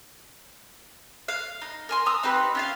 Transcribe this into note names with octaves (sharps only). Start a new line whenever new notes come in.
F5
D#4
A#4 G#5 C6
A#5 D#6 E6
C4 D#4 G4 B4
C#4 F4 F5